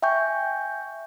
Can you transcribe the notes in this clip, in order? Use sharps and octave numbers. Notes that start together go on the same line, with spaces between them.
E5 G5 G#5 C#6 G6